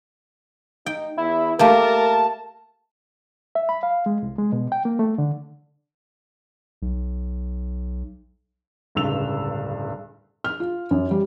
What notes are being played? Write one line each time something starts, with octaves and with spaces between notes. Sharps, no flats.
D#4 G5
E2 E4
A3 A#3 G4 A#4 A5
E5
B5
F5
G#3
C2
G#3
B2
G5
A#3
A3
D3
B1
D1 C#2 G2 E6 F7
F6
F4
F#2
G3